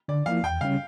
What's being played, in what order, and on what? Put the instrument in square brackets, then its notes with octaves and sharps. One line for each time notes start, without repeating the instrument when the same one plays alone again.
[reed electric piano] D3 [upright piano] D5
[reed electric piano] F3 A#3 E4 [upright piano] F5
[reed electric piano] E2 [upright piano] G5
[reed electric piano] C#3 G3 C#4 [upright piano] F5